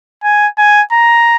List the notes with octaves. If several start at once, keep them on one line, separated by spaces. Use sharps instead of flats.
G#5
G#5
A#5